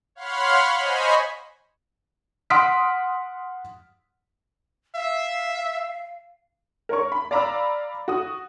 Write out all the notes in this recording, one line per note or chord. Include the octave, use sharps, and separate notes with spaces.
C#5 F5 F#5 B5 C6 F6
C5 D#5 G#5 B5 C#6
F#5 C6 D#6 F6 B6 D7
E5 F5
A#4 C#5 C#6
B5
D5 F5 A#5 B5 D6 E6
F#4 D#6